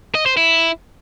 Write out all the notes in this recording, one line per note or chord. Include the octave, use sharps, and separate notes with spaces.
D#5
C5
E4